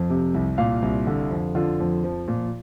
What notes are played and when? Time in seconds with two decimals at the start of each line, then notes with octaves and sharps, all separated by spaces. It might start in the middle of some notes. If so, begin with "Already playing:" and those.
Already playing: F2
0.10 C3
0.34 C2
0.58 A#2 F5
0.82 C2
1.07 D3
1.31 F2
1.55 D3 F4
1.80 F2
2.03 F3
2.28 A#2